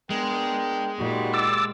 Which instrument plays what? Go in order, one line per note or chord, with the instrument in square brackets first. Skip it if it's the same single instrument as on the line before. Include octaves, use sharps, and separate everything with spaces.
[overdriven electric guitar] G#3 [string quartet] B3 [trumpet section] D4 A#4 G5
[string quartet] A#2 G3 [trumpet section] D#4 F#4
[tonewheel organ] D6 E6 A6